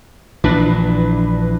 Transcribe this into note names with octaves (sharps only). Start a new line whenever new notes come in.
A#1 A#2 E3 D4 B4